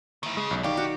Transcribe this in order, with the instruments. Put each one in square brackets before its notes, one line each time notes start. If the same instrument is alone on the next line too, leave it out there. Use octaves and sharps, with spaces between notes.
[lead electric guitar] D#3 E4 [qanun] D#5
[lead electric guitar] C#3 [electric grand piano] G#3
[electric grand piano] B1
[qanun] D#3 [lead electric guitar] G4 [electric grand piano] D5 F5 C#6
[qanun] F#4